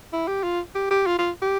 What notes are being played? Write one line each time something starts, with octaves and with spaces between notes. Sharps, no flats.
E4
G4
F4
G4
G4
F4
F4
G4